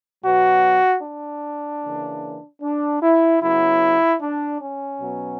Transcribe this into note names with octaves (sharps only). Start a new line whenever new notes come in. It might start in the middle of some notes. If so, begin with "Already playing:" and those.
B2 F#3 B3 F#4
D4
C#3 E3 A#3
D4
E4
C#3 F#3 B3 E4
D4
C#4
B2 F#3 B3